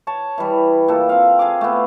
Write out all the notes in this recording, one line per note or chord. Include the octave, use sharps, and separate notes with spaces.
C#5 A5
E3 G3
A#2 A4
C4 F5
G#4 F5 D6
A3 B3